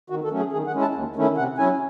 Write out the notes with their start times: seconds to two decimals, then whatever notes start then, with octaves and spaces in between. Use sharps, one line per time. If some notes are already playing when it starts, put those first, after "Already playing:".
0.10 D#3 F#4
0.24 A4
0.31 F#3 A3 C#4
0.39 G#4
0.52 D#3 G#4
0.67 F#5
0.74 G#3 C#4 E4
0.81 A5
0.95 D#2
1.16 D#3 A3 C#4 E4
1.37 C3 F#5
1.58 F#3 C#4 E4 G#5